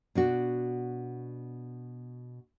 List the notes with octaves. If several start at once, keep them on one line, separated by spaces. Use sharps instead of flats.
B2 D4 F#4